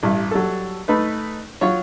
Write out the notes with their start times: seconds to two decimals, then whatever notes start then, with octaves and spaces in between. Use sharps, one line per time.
0.03 A1 G2
0.31 F#3 G3 A4
0.88 A3 D#4 B4
1.61 F#3 F4 C#5